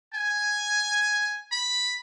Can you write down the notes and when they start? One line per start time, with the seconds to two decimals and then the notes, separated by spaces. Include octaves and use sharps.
0.13 G#5
1.52 B5